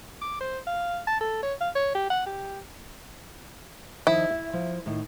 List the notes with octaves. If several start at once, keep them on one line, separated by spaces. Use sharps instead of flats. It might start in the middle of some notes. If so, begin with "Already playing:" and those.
D6
C5
F5
A5
A4
C#5
F5
C#5
G4
F#5
G4
D#3 F3 E4 D#5
E5
F3
A2 D#3